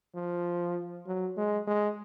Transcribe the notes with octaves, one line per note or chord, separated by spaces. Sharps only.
F3
F#3
G#3
G#3